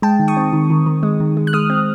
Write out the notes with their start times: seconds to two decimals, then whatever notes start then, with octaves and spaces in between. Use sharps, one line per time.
0.02 G#3 G5 A5
0.19 D#3
0.28 C#6 D#6
0.37 C4
0.53 D#3
0.70 D#3
0.86 D#3
1.03 G#3
1.20 D#3
1.37 G#3
1.47 F#6
1.53 G#3 D#6 F6
1.70 C4